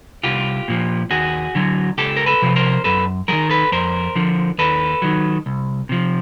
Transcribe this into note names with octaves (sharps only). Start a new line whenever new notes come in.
C2 F4 G4
A#2 F3
D#2 F#4 G#4
D3 F#3
C#2 G4 A4
A#4
A4 B4
C3 F3
A#4 C5
F#2 A4 B4
D#3 F#3 G#4 A#4
A4 B4
F2 A#4 C5
D3 F3
D#2 A4 B4
D#3 F#3
C2
C3 F3